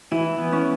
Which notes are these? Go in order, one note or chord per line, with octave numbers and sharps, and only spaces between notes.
E3 E4
B3
C#4